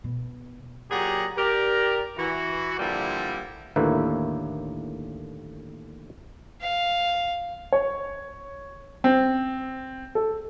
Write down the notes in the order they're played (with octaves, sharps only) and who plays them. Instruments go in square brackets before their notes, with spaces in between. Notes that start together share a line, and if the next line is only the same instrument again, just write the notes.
[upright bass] B2
[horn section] A#2 F#3 G4 G#4 F#5 A#5
G4 A#4 D5
E3 F#4
A#2 D3 F3 G3 A#3 E4
[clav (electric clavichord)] D#2 A2 D3 A#3 E4 B4
[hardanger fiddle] F5
[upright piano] C#5
C4
A4